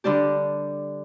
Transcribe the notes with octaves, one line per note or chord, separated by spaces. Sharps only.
D3 G3 D4 G4